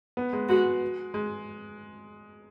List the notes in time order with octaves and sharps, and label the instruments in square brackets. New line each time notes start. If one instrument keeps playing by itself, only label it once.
[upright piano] B3
G#3
[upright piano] G#3 [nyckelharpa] F#4
[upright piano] G#3